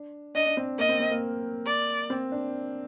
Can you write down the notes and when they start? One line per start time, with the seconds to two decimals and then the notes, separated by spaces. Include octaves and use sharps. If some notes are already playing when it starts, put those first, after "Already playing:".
Already playing: D4
0.35 D4 D#5
0.47 D4
0.57 C4
0.79 A#3 D#5
0.89 C4
1.00 C4
1.11 A#3
1.66 D5
2.10 C4
2.32 D4